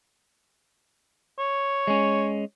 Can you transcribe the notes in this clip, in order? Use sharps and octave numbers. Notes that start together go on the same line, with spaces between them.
C#5
G#3 C#4